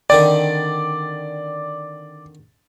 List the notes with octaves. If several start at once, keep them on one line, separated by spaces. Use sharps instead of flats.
D3 D#3 C4 D5